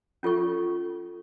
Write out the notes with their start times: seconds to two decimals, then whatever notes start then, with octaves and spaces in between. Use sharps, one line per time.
0.23 C#4 F4 A4 C#6